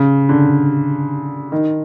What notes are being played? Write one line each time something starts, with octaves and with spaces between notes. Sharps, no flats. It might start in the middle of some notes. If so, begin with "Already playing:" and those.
Already playing: C#3
D3
D#3